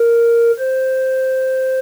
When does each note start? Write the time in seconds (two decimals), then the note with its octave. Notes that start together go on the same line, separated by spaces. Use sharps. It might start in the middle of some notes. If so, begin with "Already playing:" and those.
Already playing: A#4
0.59 C5